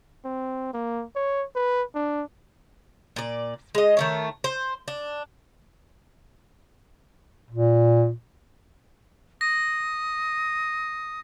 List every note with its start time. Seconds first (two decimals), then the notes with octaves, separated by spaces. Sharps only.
0.25 C4
0.73 A#3
1.16 C#5
1.55 B4
1.95 D4
3.16 A#2 D5
3.75 G#3 D#5
3.97 D#3 A3 C#5
4.44 C5
4.88 D4
7.51 A#2
9.41 D#6 A#6